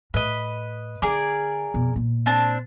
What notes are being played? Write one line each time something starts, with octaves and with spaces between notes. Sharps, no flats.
A2 B4 D#5
D3 G#4 A#4 D5
F2 B2
A#2
C4 D4 A5